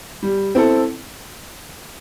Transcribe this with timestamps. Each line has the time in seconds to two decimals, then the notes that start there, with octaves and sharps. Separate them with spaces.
0.23 G3
0.55 C4 E4 A4